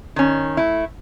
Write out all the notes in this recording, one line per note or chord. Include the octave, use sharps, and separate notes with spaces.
D#3 C#4
A3 E4